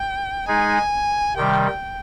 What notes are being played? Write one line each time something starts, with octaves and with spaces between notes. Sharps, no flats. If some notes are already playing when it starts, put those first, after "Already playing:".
Already playing: G5
G#3 D#4 G#4 G#5
C3 D#3 G3 G5
G5